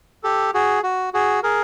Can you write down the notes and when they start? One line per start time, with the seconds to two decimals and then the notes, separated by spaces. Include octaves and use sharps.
0.23 G4 A4
0.54 F#4 G#4
0.83 F#4
1.14 F#4 G#4
1.43 G#4 A#4